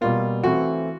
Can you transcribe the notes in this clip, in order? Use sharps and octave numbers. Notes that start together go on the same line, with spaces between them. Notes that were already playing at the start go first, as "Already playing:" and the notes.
B2 G3 A#3 F4
E3 A3 C4 E4 F#4